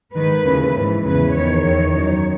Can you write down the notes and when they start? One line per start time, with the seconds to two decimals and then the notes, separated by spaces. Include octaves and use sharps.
0.15 G#2 D#3 B4
0.45 D#2 C#3 E3
0.74 G#2 E3
1.04 E2 C#3 E3 B4
1.34 E2 D#3 C#5
1.63 E2 D#3 C#5
1.94 F#2 D#3